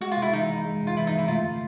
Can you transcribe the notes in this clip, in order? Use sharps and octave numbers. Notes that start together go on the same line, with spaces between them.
G#3 F#4
F4
C3
E4
E3 D#4
C3
G#3
C3
F4
E3 E4
D#4
C3
E4
A3 F4
D3